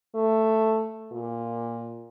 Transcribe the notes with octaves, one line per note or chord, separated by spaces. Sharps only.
A3
A#2